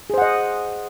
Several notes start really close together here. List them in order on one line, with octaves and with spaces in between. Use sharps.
G#4 C5 F#5 D#5